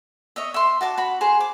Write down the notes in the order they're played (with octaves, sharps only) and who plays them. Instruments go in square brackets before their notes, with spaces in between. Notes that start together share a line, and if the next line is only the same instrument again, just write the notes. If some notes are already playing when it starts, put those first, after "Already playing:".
[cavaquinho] C#5 D#5 E5
E5 C6
F#4 A5 D6
F#4 B5
G#4 C5
D6